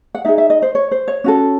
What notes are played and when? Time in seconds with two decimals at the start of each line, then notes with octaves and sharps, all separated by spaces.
0.15 F#5
0.25 D#4 G#4 E5
0.38 E5
0.50 D#5
0.62 C5
0.75 C#5
0.91 C5
1.08 C#5
1.24 C#4 F#4 A4